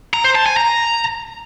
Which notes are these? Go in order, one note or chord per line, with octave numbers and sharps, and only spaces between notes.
A#5
C5
A5
G#5
A#5